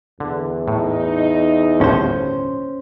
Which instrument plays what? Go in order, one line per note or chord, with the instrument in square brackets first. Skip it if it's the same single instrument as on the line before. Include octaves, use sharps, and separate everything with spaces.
[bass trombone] E2 [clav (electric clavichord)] D3
[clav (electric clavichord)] A2 [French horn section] D#4
[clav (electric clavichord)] G1 D#2 A2 [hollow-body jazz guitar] C#4 C5